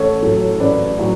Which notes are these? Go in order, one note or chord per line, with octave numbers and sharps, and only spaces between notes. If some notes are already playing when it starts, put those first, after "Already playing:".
Already playing: A1 A4 C#5
A2 F#3 A3
A1 B4 D5
A2 F#3